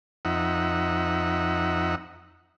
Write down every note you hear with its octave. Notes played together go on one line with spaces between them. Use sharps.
F2 D#4 E5 F#5